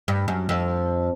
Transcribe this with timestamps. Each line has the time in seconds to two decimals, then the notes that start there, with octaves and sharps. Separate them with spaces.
0.08 G2
0.28 F#2
0.49 F2